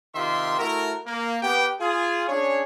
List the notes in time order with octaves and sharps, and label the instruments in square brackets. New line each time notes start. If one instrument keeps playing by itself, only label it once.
[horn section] C3 D#3 F4 G4 E5 C6
A3 E4 F#4 A#4
A#3
B3 G4 G5
F4 G#4
C#4 D4 G#4 C#5